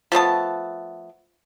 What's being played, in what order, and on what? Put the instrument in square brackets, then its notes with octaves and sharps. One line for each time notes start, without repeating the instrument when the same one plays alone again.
[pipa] F3 A3 B3 A5